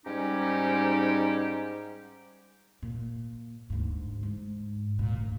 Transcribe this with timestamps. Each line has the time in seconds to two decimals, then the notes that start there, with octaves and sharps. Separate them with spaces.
0.06 G#2 G3 C#4 D#4 G4
2.82 A#2
3.70 D2 G#2
4.23 G#2
4.99 A#2
5.13 D2